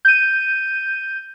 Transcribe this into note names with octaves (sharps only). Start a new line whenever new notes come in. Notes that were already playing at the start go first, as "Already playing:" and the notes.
G6 D#7